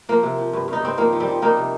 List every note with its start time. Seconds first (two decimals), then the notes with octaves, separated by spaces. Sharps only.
0.09 F3 A#3
0.23 C3
0.38 F3
0.53 G2
0.68 G2 D#4
0.82 G2 C4
0.98 F3 A#3
1.13 F3
1.20 G3 C4
1.28 F3
1.42 G3 A#3 D#4
1.57 C3